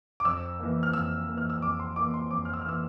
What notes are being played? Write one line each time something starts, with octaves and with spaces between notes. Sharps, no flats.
D6
F2 E6
E3 A#3
F6
F2 E6
E3 A#3
F6
E6
F2 D6
C6
E3 A#3 D6
C6
F2 D6
F6
E6
F6
E3 A#3 E6